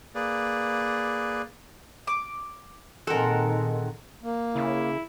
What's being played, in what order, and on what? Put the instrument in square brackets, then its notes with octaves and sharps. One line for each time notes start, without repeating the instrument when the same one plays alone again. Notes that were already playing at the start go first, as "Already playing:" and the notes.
[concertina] A#3 G#4 B4 D5
[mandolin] D6
[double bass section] A#2 D#3 [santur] G#3 C4 [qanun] A4 A#4 [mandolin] F#5
[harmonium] A#3
[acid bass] C#3 [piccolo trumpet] E4